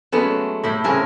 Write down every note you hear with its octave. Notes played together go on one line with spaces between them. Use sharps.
F#3 G#3 A3 B3 C#4
A2 E4 G5 B5
A2 C#3 C4 A#4 C#5 G#5